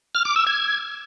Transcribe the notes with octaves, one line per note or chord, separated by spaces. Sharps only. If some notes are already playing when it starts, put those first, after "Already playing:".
F6
D6
E6
G#6